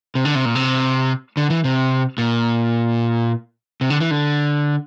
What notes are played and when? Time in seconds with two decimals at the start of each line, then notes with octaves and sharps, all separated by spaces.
0.15 C3
0.25 D3
0.35 C3
0.45 A#2
0.55 C3
1.37 D3
1.50 E3
1.64 C3
2.18 A#2
3.81 C3
3.90 D3
4.00 E3
4.11 D3